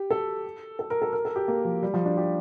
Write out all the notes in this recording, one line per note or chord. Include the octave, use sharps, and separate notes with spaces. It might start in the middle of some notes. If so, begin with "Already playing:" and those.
Already playing: G4
A4
A4
A#4
A4
A#4
A4
G4
A#3
F3
G3
F3
D4
G4